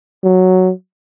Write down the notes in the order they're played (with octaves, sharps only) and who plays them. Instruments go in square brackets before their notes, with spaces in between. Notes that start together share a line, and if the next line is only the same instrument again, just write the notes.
[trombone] F#3